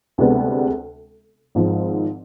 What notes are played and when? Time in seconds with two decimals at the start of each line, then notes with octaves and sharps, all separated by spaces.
0.18 D2 C3 G#3 B3 D4
1.55 G#1 G#2 F3